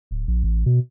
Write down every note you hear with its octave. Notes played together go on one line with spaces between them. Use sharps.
D1
A#1
A1
B2